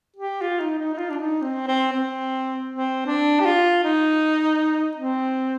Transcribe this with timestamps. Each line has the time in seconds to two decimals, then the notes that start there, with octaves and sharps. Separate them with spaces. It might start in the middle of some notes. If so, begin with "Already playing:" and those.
0.16 G4
0.41 F4
0.60 D#4
0.79 D#4
0.93 D#4
0.98 F4
1.10 D4
1.17 D#4
1.42 C4
1.67 C4
1.93 C4
2.69 C4
3.06 D4
3.40 G4
3.45 F4
3.84 D#4
4.97 C4